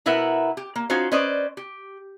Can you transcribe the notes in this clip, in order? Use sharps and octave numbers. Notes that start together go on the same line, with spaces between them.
B2 E4 A#4 B4 E5 F#5
G4
A#3
C#4 D#4 F4 F#4 C5
C#4 B4 C5 D5 D#5
G4